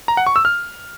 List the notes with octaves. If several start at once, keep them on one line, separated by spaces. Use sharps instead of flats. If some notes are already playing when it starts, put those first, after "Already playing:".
A#5
F#5
C#6
E6
F6